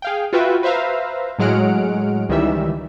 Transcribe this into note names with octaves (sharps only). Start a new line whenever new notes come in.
G#4 F5 G5
F4 F#4 B4 E5 G5
B4 C5 E5 F5 A#5
A2 F#3 G#3 F#5 F6 D7
C#2 D#3 E3 G3 E5 E6